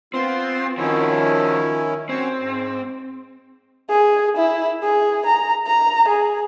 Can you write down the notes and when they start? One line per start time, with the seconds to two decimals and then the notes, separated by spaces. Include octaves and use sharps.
0.14 B3 C4 F4 C6
0.78 D#3 F3 C#4 E4 F#4
2.09 F#3 C4 C#4 C#5
2.39 G#2
3.90 G#4
4.37 E4
4.83 G#4
5.26 A#5
5.67 A#5
6.08 G#4